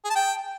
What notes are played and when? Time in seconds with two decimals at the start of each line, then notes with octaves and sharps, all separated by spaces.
0.05 G#4
0.10 A5
0.16 G5